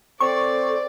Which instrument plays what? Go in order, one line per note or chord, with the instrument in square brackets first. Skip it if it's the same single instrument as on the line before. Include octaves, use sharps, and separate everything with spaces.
[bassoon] C4 [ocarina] A4 [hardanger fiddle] D5 [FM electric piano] C#6